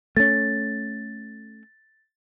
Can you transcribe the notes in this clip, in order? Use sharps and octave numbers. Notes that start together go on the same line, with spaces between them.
A3 C#4 A6